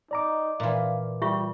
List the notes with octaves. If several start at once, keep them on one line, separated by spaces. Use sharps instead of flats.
D#4 D5 A#5 D6
A#2 E3 F5
G3 F4 E5 C#6